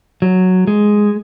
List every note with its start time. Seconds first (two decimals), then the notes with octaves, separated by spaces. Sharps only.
0.22 F#3
0.67 G#3